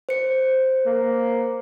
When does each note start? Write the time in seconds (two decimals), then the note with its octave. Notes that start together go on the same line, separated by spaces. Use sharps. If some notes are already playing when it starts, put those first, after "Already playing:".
0.09 C5 C#7
0.86 A#3